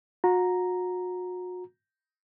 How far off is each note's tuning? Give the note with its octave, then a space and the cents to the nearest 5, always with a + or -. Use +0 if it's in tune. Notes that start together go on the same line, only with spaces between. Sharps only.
F#4 -35 A#5 +0